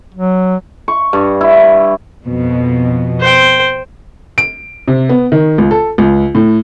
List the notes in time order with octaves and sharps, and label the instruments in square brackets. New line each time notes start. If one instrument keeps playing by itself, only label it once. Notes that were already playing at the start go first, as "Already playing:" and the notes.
[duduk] F#3
[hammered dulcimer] C#6
G2
E4
[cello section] F2 B2
[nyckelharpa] C5 G5
[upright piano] D7
C3
B3
D#3
C#2
A4
C#2
A2